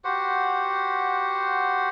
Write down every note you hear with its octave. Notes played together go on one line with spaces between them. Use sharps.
F#4 G4 C5 F#5